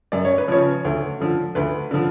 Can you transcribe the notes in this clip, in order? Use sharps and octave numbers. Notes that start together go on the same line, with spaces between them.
F#2 D5
C#5
B4
C#3 F3 C#5
D2
D3 F3
D2 B4
D3 F3